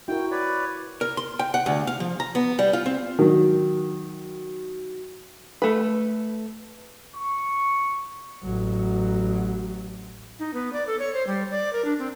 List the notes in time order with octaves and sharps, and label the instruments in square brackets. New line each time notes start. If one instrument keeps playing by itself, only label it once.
[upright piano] E4 [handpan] F#4 A#4 [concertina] G5
[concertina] B4 C#5 D5
[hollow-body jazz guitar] A#4
C6
G5
F#5
D2
F5
F3
A#5
B3
G3
F4
C4
[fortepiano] D#3 F#3
[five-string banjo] A3 B4
[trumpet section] C#6
[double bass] A1 F#3
[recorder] D#4
B3
D5
A4
C#5
C5
G3
D5
A#4
D4
C4